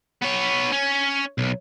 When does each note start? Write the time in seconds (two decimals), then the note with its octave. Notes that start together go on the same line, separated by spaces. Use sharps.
0.22 B3 C#5
0.72 C#4
1.38 B1